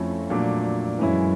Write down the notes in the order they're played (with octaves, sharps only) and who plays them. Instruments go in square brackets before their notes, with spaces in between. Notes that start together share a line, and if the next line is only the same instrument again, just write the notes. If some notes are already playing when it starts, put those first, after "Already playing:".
Already playing: [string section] F2 [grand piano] F3 A3 C#4 E4
[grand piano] A#2 F#3 A3 D4
[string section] F#2 [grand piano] E3 G#3 C#4 E4